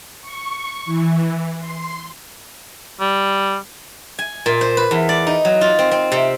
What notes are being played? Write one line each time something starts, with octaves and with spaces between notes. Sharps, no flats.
C#6
E3
C6
G3
G#5
A#2
C5
B4
E2
D5
D#4
F#3
F4
C4
C4
C3